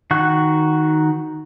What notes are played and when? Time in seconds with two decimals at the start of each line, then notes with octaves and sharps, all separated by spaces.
0.11 D#3 F#4 F#5 F#6